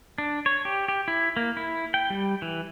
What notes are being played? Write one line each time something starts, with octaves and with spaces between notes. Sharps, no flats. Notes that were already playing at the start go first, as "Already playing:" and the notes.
D4
C#5
G4
G4
E4
A#3
E4
G5
G3
E3